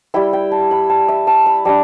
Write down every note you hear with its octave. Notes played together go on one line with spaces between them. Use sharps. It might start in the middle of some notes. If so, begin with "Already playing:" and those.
G3 E4 G5
G5
A5
B5
A5
E5
A5
B5
G3 D4 A5